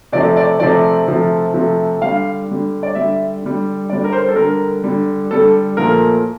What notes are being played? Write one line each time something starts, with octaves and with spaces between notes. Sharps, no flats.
C3 F3 A3 D5
D5
C3 F3 A3 D5
C3 F3 A3
C3 F3 A3
D3 G3 F5
D3 G3
D5
D3 G3 E5
D3 G3
D3 G3 D5
A#4
C5
A4
D3 G3 A#4
D3 G3
D3 G3 A4
A#2 F3 A3 A#4